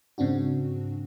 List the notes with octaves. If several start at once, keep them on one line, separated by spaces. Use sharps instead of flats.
G#2 C#3 C4 D4 F#4